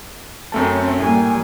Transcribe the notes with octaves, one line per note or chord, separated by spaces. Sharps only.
F#2 A3 C4 C#4 A5
A2 G3 A#3 G#5